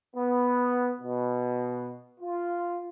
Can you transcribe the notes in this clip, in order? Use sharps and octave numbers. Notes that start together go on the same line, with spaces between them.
B3
B2
F4